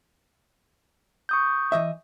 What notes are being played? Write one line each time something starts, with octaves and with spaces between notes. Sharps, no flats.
C#6 D#6 G6
E3 D#5 E5